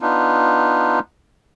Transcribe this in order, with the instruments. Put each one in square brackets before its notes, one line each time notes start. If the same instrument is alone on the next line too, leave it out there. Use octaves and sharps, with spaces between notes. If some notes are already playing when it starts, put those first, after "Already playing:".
[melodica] B3 D4 D#4 F4